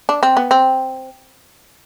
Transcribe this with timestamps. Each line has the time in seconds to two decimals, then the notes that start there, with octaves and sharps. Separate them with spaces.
0.09 D4
0.23 C4
0.37 B3
0.51 C4